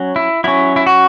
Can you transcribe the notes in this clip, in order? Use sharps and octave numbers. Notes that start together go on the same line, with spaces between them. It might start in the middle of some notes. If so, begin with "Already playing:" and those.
Already playing: F#3 C#4
E4
F#3 C#4 E4
E4
F#4